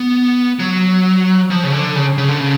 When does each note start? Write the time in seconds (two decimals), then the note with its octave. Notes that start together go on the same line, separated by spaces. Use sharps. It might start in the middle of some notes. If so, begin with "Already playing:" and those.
Already playing: B3
0.60 F#3
1.50 F3
1.63 C#3
1.72 D3
1.96 C#3
2.18 C#3
2.29 D3
2.40 C#3